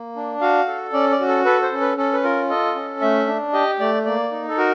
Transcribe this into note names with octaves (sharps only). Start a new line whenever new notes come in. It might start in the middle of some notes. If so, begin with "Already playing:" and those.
Already playing: A#3
D4
F#4 F5
A4
C#4 D5
D5
F#4
A4
A4 B4
C5
C#4
B4
C#4 A4
B4
F4 A#4
A4 D#5
C#4
A3 E5
D4
G4 D#5
A3 D5
A#3 D5
D#4
A4
F#4 A#4